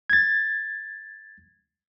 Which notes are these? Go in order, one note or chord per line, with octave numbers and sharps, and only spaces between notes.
G#6 A6